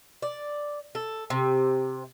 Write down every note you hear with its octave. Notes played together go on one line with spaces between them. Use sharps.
D5
A4
C3